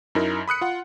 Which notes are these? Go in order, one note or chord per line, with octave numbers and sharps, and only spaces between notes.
F#2 D#4 E4 A#4
B5 D#6 F#6 C#7
F4 F#5